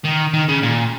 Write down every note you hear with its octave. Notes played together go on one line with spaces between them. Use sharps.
D#3
D#3
C#3
A#2